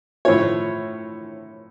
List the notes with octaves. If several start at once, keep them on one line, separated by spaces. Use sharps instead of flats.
A2 F3 C#5